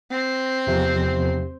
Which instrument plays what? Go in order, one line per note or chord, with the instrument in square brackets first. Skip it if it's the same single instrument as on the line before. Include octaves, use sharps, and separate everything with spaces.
[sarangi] C4
[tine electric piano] E2 C3 F3